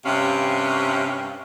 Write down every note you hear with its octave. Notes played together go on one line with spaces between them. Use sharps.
G2 C3 C#4 F5